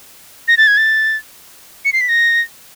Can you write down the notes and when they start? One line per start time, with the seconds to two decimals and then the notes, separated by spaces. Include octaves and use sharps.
0.48 A#6
0.57 A6
0.67 G#6
0.77 A6
1.85 C#7
1.93 C7
2.01 B6
2.09 A#6